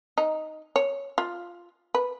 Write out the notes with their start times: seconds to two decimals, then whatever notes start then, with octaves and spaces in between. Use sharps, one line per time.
0.18 D#4
0.76 C#5
1.18 F4
1.95 B4